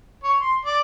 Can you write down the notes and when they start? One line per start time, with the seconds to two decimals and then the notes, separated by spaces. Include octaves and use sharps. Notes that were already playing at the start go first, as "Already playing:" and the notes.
0.24 C#5
0.40 C6
0.65 D5